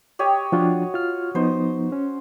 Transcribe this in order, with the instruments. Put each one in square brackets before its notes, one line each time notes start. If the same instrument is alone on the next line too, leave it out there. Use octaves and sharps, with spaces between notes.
[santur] G4 C#5 D#5
[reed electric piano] F3 D4 F4 [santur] F#4
[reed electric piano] F4 F6
[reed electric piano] F3 B3 D#4 [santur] C5
[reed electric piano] C#4